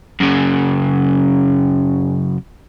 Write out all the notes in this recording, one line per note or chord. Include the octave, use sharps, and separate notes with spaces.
F#2 C#3